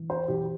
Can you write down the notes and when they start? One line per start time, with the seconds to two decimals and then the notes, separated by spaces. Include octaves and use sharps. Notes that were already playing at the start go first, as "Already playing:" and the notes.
Already playing: E3
0.10 C5
0.28 E3 G4